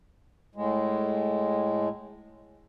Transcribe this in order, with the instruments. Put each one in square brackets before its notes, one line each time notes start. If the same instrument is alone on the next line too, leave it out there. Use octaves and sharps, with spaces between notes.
[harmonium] A2 G#3